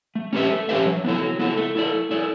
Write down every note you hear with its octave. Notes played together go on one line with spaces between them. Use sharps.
A3
C#4 G4 B4 E5
A3
C#4 G4 B4 E5
F#3
B3 E4 A4
F#3
B3 E4 A4
A3
E4 A4 D5
A3
E4 A4 D5